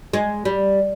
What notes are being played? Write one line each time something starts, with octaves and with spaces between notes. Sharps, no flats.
G#3
G3